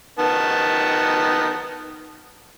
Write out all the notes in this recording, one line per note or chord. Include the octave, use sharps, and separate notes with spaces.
D#3 B3 A5